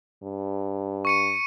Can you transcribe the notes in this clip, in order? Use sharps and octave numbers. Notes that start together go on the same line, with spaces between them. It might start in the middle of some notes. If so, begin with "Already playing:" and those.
G2
C#6 C#7 D#7